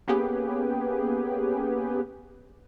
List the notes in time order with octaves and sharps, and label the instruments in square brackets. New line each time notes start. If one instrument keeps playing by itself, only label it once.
[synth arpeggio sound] A#3 B3 C#4 G4 G#4 B4